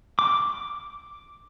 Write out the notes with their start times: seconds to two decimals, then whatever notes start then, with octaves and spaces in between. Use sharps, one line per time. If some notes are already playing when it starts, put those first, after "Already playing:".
0.19 D6